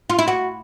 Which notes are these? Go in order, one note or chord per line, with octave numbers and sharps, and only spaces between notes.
F4
E4
F#4